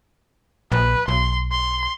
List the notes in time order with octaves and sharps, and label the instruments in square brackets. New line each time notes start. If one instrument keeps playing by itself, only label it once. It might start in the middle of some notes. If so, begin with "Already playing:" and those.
[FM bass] A#1 [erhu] B4
[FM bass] B1 [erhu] C6
[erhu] C6